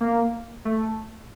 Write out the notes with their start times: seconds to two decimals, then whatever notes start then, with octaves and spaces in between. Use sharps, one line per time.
0.01 A#3
0.65 A3